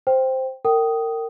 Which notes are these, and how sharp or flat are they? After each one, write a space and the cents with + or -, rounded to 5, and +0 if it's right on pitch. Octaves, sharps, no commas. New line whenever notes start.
C5 +0 G5 +0
A#4 -30 G5 -25 D#6 +0